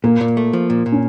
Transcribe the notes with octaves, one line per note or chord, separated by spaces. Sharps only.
A#2 A#3
A#2
A3
F3
A#2
A#2
C#4